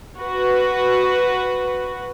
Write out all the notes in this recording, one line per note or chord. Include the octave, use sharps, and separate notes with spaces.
F#4 B4